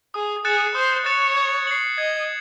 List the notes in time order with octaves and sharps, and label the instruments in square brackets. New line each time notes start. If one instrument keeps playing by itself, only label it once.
[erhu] G#4 [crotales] D#6
[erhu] G#4 [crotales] F#6 A6 C#7 E7
[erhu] C5 [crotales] D#6
[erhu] C#5 [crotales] F#6 A6 C#7 E7
[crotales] G#6
C7 F#7
[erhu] D#5 [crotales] G#6